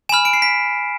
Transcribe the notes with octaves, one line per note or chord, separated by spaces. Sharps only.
G#5 B5 F6 E7
D7
C7
B6